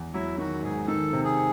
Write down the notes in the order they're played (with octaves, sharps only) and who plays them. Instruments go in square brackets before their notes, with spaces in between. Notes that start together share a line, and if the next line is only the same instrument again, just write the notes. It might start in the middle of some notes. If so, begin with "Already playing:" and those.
Already playing: [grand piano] E2
[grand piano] F#3 [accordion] E4
[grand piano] D#3 [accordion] F#4
[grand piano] G#2 [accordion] G#4
[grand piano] D#3 [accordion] A4
[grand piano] C3
[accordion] G#4